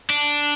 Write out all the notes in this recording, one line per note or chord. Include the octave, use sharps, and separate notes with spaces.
D4